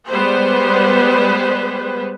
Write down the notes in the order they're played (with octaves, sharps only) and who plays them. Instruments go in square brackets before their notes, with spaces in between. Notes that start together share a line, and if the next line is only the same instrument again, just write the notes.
[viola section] G3 G#3 B3 B4 C5